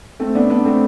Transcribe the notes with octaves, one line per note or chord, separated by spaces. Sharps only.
A3 C4
B3 D4
B3 D4
A3 C4